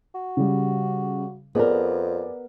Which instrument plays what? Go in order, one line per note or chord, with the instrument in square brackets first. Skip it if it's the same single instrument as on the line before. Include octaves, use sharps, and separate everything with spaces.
[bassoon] F#4
[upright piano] C#3 G3
[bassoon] F2 [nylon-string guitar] B3 A#4 [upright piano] G#4 D5